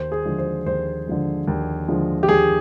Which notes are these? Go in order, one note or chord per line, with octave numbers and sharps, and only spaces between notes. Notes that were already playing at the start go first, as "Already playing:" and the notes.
Already playing: D#2 C5
G#4
D3 F3 G#3
C5
D#2 C5
D3 F3 G#3
D#2
D3 F3 G#3
G4
D#2 G#4